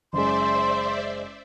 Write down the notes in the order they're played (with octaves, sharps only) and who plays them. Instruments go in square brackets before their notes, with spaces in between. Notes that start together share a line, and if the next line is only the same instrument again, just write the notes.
[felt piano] F#1 G#3 [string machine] C5 D5 E5 [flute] C6